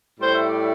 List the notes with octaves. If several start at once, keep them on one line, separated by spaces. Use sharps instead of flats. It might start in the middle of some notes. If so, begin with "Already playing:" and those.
A2 G3 C5
E5
D5
E5